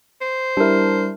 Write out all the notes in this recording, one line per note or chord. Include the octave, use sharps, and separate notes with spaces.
C5
G3 D4 E4 A#4